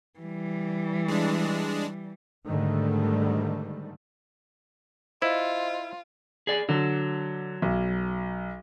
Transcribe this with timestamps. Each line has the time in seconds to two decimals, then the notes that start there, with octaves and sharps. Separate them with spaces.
0.20 E3 G3
1.08 G#3 D4
2.46 G#2 D3 D#3 G3 A3
5.22 E4 F4 C5 D#5
6.47 G#4 D5
6.69 D3 F#3
7.62 B1